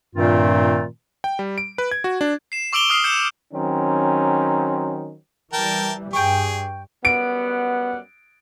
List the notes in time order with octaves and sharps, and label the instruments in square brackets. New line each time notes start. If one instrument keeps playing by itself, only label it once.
[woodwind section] G2 A#2 D#3 A3 C4 F4
[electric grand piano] G5
G3
D7
B4
G#6
F#4
D4
[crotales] C7 E7
C#6 D6 E6 D7 F7 G7
D#6 F6 C7
E6 G6 C#7 E7
[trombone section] D#3 F#3 C4 C#4
[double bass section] E3 G3 [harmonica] A#4 G5 A5
[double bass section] G2 [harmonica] G#4 [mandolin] G5 C#6
[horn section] F#2 G3 F#5 [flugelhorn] B3 [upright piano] D7